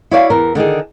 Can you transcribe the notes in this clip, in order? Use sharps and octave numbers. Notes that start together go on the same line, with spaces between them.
E4 F#4 C#5 D5 E5 F5
E2 E3 A#4
D3 D#3 D#4 G#4